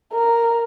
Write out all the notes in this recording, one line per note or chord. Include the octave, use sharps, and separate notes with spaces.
A#4